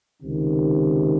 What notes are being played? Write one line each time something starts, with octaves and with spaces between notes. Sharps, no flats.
C#2 C3 D#3